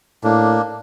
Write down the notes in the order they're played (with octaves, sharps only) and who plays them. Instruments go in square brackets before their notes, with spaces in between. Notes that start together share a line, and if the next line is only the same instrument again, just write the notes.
[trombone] A2 [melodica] A#3 D4